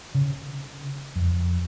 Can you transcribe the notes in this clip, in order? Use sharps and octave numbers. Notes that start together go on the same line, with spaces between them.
C#3
F2